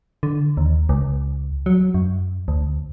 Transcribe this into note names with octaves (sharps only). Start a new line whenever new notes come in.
D3
D#2
C#2
F#3
F#2
D2